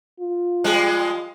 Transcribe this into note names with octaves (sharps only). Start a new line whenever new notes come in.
F4
F3 G3 G#3